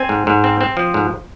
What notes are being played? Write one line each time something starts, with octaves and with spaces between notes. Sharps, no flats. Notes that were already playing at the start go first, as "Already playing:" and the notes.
Already playing: C4 G#5
G#2
G#2
C4
C4
F3
G#2